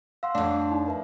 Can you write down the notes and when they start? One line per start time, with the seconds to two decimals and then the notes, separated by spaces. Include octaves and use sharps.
0.23 F5 F#5 C6 E6
0.35 F2 A3 D4 C#5
0.71 D#4
0.86 A#4 B4 E5